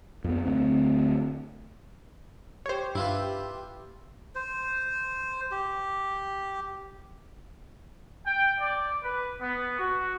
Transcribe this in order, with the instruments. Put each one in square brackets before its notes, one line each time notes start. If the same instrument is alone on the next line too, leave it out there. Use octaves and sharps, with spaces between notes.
[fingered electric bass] F2 B3
D2 C4
[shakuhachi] G4 [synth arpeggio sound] C5 C#5
[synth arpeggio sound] G2 [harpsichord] E4 F4 B4
[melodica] C5
G4
[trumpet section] G5
D5
B4
B3
F#4